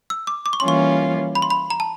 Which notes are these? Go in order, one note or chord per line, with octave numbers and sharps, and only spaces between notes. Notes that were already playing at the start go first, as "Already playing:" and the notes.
E6
D6
D6
C#6
C6
E3 G3 A#3 C#4 F4 C#6
B5
C6
B5
A#5
A5